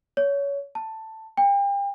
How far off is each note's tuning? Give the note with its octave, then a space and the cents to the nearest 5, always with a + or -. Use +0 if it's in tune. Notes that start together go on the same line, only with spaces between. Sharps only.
C#5 +20
A5 +10
G5 +35